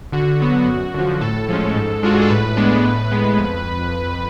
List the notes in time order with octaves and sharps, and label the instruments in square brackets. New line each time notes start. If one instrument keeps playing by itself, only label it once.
[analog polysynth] D3 F#4
F#3 B3
F#2
D3 F3
A2 A4
F3 G#3 C#4
G#2
G#3 D4 F4 F#4
G#4
A4
A2 B4
G#3 B3 D4
A2
G#3 B3
F2